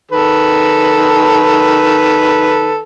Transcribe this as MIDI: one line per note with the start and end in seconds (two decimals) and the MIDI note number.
0.11 2.83 51
0.11 2.83 69
0.11 2.83 71